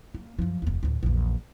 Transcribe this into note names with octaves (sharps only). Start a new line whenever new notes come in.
A#3
F#2 F3
F1 D#2
A1 D2
A#1 E2